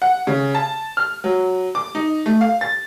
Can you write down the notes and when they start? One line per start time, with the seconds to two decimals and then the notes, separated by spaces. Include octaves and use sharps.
0.02 F#5
0.27 C#3
0.55 A5
0.97 F6
1.24 F#3
1.75 D6
1.95 D#4
2.26 A3
2.41 F5
2.61 A6